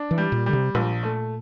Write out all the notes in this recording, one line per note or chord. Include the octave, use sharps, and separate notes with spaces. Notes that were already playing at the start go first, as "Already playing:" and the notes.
Already playing: D4
E3
G3
A#2
D3 G3
C3
A#1 A#2
A3